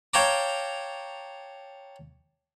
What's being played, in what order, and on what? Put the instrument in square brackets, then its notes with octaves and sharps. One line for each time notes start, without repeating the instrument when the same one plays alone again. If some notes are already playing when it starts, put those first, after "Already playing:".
[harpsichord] C#5 F5 G5 A5 A#5 D6